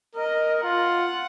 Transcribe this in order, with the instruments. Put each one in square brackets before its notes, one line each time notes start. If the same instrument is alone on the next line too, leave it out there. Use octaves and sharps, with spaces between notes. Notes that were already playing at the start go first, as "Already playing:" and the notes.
[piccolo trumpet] A#4 [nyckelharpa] D#5
[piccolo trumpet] F4 [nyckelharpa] F#5